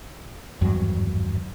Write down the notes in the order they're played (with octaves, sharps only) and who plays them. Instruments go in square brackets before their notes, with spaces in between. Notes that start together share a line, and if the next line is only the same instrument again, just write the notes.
[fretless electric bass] G#1 E2 G2 F#3